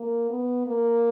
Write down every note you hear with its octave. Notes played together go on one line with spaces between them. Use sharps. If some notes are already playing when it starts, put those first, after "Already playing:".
Already playing: A#3
B3
A#3